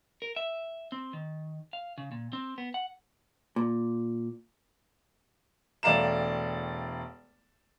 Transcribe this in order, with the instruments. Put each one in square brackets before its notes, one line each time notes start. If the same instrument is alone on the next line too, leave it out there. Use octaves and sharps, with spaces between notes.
[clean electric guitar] A#4
E5
C4
D#3
F5
C#3
A#2
C4
B3
F#5
[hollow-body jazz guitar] A#2
[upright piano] E1 A3 D5 F5 A#5 E7